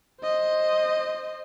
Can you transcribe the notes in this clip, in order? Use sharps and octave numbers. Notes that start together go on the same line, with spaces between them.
C5 D#5